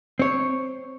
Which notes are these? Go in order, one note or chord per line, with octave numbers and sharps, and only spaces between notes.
C4 C#5